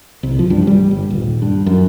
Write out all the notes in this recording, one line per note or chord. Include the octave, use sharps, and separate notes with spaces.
C2
F3
G2
G3
G1
D#1
G2
F#2